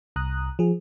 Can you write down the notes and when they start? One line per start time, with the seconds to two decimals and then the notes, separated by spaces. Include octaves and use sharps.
0.16 C2 A#5 D#6 F#6
0.59 F3 G#4